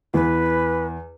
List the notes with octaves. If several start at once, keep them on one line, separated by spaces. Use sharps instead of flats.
E2 B4